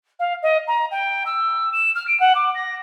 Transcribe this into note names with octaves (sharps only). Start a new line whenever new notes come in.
F5
D#5
A#5
G5
E6
E7
F6
D7
F#5
D6
A#6